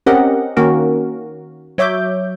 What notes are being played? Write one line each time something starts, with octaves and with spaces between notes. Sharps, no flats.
C4 C#4 G4 A#4 D#5 F#5
D#3 A#3 C#4 F#4 A#4
F#3 C#5 E5 D6 G6